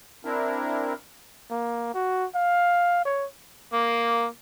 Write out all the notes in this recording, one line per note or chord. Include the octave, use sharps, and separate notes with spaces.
C4 D4 E4 A#4
A#3
F#4
F5
C#5
A#3